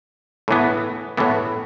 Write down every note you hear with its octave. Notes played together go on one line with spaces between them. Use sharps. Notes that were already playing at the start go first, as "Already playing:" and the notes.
A2 E3 B3
A2 E3 B3